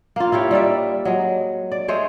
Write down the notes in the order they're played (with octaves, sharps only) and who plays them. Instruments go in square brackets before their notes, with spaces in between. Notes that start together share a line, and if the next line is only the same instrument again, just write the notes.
[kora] A#3 F4
E4 F4 G4 C#5
G3 D#4 D5 E5
F#3 G#3
D5
G#3 A3 C5 C#5